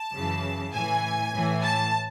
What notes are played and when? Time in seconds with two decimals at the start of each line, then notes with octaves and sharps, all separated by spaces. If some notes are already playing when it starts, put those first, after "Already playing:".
Already playing: A5
0.13 F#2 C#3 E3
0.72 A2 E3 G#5
1.33 A2 E3
1.63 A5